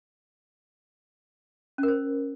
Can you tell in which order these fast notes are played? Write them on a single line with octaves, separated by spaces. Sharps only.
C#4 A#4 C5